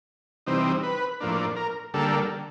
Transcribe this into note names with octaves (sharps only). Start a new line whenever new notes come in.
C3 E3 G3 C4 D#4
B4
A2 F3 A#3 D4
A#4
D3 G3 A#3 A4